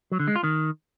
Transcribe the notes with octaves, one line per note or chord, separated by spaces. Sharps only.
F#3
D3
G#3
F4
D#3